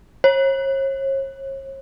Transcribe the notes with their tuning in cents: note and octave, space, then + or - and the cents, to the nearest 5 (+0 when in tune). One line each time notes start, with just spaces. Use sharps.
C#5 -40